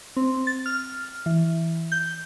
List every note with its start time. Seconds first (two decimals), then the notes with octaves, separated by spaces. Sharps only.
0.17 C4
0.47 A6
0.66 F6
1.26 E3
1.92 G6